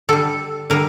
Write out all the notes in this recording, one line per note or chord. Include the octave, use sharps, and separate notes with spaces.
D3 G3 A4
D3 G3 A#4